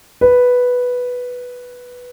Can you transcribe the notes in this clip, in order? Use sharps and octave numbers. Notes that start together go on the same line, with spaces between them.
B4